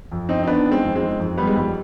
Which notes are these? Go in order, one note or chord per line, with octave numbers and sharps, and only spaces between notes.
F2
F2 C4 D#4
D#4
D#3 B3 D4
D#3
G#3 C4
F2
G#3 C4
D#3
F2
D#3 G3 B3
G#3
F2 G3